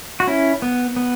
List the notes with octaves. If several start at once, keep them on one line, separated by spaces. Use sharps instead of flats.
F#4
C#4 E4
B3
B3